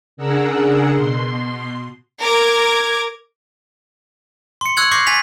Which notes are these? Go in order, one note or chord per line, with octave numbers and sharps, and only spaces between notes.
C#3 D4 G#4 A#4 F#5 E6
B2 C6
A#4 D6 G#6
C6 C#7
C#6 E6 F#6 G#6 C#7 F#7
C#6 D6 F#6 G6 A#6 C7
G#5 A6 B6 F7